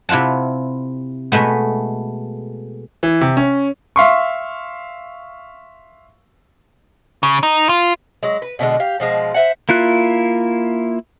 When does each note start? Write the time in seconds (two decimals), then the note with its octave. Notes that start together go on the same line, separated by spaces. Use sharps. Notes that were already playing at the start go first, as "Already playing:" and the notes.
0.09 C3 E4 F4 F#5 A5
1.32 B2 G#3 A3 B3
3.03 E3
3.21 C3
3.37 C#4
3.96 E5 F5 C6 C#6
7.23 C#3
7.43 D#4
7.69 F4
8.23 F#3 G#3
8.42 B4
8.59 B2 D3 E3 G#3
8.80 G4 F5
9.00 B2 F3 G#3
9.34 C5 E5 F#5
9.69 A#3 E4 F4 F#6